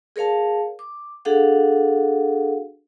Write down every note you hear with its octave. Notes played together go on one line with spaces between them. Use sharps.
G#4 A#4 C#5 F5 A5
D6
D4 F#4 G#4 A4 F5 F#5